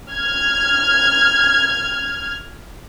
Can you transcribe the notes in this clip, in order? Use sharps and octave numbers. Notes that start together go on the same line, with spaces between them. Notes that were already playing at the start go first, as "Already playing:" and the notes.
F6 G#6